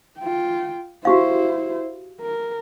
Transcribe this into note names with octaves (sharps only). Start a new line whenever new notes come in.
F4 G5
E4 F#4 G4 C5 F5
A#4